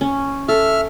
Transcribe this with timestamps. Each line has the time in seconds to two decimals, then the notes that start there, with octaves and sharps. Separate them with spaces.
0.01 C#4
0.48 A4 E5 F6